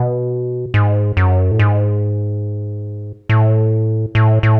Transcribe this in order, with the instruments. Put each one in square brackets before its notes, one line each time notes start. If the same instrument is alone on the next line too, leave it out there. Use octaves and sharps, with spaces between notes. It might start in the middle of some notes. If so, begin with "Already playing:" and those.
Already playing: [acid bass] B2
G#2
F#2
A2
G#2
A2
A2
A2